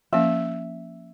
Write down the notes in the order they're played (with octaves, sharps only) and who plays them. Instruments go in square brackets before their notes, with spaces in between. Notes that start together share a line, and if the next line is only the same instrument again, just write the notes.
[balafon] F3 A#3 C#4 [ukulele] E5